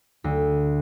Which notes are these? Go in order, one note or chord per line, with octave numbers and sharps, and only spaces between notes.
D2